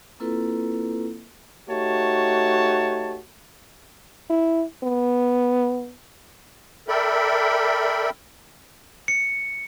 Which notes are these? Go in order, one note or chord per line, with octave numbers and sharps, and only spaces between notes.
A#3 C4 E4 F4 A4 B4
A3 D#4 F#4 G4 C#5 A5
E4
B3
A4 A#4 D5 E5 G5 B5
C#7